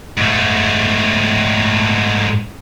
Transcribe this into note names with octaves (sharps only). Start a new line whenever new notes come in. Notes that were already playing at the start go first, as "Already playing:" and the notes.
G#2 A3